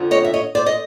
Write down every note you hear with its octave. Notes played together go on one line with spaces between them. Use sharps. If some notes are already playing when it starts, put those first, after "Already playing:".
Already playing: F2 D3 F3
C#5 D#5
E5
C#5 D#5
C5 D5
D#5